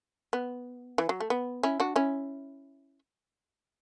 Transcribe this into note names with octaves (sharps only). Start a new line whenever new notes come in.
B3
E3
F#3
A3
B3
C#4 E4
D4 F#4
C#4 E4